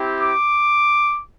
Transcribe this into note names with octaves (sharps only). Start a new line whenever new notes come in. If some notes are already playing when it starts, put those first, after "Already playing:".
Already playing: C4 E4 G4
D6